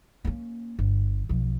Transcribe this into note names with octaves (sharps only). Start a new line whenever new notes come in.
A#3 C#4
G1
B1 F3